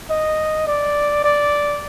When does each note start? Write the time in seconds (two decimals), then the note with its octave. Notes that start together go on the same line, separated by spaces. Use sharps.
0.10 D#5
0.67 D5
1.24 D5